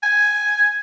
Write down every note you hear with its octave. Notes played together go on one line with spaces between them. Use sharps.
G#5